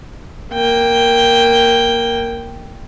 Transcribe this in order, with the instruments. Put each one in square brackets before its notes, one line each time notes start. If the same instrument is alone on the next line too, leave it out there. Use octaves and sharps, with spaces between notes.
[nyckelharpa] A#3 G5